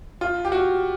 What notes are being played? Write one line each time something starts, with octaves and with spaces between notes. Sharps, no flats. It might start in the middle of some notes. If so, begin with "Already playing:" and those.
F4
G4
F#4